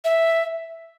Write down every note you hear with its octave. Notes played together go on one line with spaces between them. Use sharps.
E5